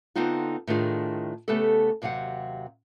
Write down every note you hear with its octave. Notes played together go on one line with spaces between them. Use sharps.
D3 B3 C4 D#4 F4
A2 D#3 D4 F4 G#4
C#3 A3 B3 G4 A4
D#2 C3 F#3 F5 F#5